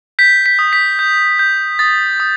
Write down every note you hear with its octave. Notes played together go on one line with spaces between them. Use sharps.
G6 B6
B6
D#6
B6
G6
G6
D#6 A6
D#6